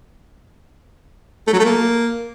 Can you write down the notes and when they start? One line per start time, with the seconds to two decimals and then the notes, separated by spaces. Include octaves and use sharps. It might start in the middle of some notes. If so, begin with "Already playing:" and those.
1.47 A3
1.53 F#3
1.59 A3
1.65 A#3